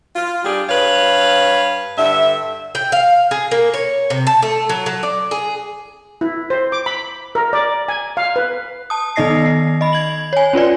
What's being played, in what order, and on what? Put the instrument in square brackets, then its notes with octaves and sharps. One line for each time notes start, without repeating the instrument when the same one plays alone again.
[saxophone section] F4
G3 D4 G4 G#4
G2 B4 C#5 F5
G2 D3 E5
[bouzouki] G5
F5
G#4
A#3
C#5
C3
A5
A3
F#3
F#3
D5
G#4
[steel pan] E4
C5
D6
B5
A#4
D5
G#5
F5
B4
[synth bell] A5 D#6
D#3 B3 D#4 D#5 A#6 C7
D#5 B5
G#6 F#7
C#5 G#5
C#4 F4 B4 D5